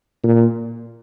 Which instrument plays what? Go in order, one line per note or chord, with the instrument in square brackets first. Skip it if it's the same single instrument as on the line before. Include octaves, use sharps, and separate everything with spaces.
[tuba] A#2